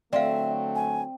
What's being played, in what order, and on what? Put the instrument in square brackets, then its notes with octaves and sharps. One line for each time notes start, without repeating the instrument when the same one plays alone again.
[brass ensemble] D3 F#3 A3 [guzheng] C4 [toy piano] D5 F5 [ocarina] E5
[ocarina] G#5